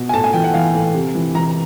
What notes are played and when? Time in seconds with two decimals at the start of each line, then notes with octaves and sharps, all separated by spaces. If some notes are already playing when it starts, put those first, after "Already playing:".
Already playing: B2
0.09 G#5
0.13 A2 A5
0.24 G#5
0.33 E3 G5
0.44 F#5
0.54 E3 F5
0.75 A2
0.94 C3
1.15 E3
1.35 E3 A#5